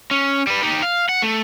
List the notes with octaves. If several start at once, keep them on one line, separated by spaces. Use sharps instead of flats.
C#4
G3 B4
D#4 G4
F5
F#5
A3